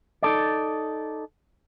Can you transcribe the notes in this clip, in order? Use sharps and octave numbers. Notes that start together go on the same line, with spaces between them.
D#4 A4 D5